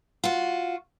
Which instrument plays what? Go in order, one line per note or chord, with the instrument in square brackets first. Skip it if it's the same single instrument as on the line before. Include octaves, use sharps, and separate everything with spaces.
[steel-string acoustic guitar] F4 F#4